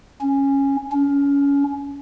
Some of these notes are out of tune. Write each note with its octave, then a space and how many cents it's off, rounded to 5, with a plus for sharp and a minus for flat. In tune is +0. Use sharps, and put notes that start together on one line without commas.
C#4 -10
C#4 +25